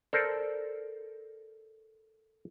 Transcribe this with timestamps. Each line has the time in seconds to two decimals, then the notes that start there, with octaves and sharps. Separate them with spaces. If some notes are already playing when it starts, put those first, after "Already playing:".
0.13 A4 A#4 C5 D5